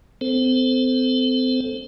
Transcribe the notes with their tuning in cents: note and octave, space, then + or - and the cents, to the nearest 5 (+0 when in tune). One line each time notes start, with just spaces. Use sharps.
C4 -40 A4 +0 C5 +0